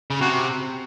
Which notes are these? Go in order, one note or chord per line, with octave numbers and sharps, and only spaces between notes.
C#3
C3 F#4